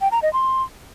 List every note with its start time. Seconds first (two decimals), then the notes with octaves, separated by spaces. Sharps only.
0.01 G5
0.12 A#5
0.22 D#5
0.33 C6